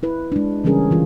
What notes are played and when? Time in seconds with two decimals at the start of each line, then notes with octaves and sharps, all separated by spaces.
0.03 E4 B4
0.32 G#3 D4
0.64 C#3 E3 G3 C#4 G#4 A#4
0.90 D3 E3 F4